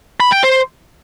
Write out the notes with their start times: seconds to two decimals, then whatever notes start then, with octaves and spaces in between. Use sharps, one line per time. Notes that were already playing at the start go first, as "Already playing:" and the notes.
0.20 B5
0.32 G5
0.44 C5